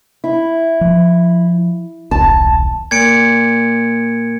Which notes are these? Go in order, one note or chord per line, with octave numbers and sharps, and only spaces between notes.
E4
F3
D#1 B1 A5
A#2 G#6 C#7 D7